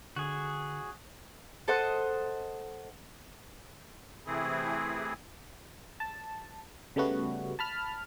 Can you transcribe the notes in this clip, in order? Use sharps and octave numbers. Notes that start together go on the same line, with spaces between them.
D3 F#4 G#4
A4 C5 D#5 F#5
C3 E3 A3 C4 E4 G#4
A5
C#3 G3 A3 B3 F#4
A5 B5 F6